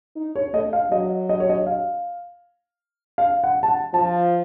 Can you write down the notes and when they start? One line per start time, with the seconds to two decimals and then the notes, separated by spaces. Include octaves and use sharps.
0.16 D#4
0.36 C#5
0.54 A3 D#5
0.73 F5
0.91 F#3 D#5
1.29 D#5
1.40 C#5
1.50 D#5
1.67 F5
3.18 F5
3.44 F#5
3.63 A5
3.68 F#5
3.93 F3 A5